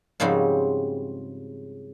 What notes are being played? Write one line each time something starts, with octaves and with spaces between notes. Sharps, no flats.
G#2 C#3 F3 G3 C4 F#4